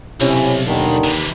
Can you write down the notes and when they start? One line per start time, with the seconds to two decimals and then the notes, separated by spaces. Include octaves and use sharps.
0.21 B1 C3 C#4 E4
0.67 D#2 D3 D#3
1.04 C3 E3